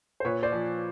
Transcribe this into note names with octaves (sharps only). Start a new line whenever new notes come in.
C5
A#2 B4 C#5
C5 D5
F3